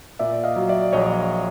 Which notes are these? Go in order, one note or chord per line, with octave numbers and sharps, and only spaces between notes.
A#2 D5 E5
D#5 F5
F#3
D5 E5
A#1 C#5 D#5